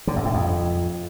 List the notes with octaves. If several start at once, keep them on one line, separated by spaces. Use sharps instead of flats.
D3
F#2
A2
F2